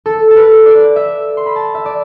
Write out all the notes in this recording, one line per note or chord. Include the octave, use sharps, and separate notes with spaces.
A4
A4
B4
D5
E5
C6
B5
A5
E5
D5